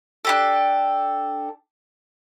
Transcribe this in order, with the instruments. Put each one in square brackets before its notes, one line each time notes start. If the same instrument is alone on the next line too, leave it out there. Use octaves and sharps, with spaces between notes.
[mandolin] D4 G4 A4